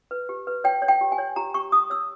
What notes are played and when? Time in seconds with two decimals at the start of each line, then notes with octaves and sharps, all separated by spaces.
0.11 B4
0.29 G4
0.47 B4
0.64 C#5 G5
0.82 C#5
0.88 G5
1.01 G4
1.12 G#5
1.18 C#5
1.36 G4 A#5
1.54 G4 C#6
1.72 G4 D#6
1.90 C#5 E6